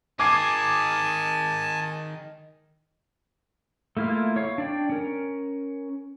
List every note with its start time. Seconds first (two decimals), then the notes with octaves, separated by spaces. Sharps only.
0.20 D#3 G#4 G#5 A5 D6 G#6 C7
3.97 A3 A#3 E4 F4 F6
4.36 C#5 F5
4.58 D4 D5 G5
4.90 C#4 A#4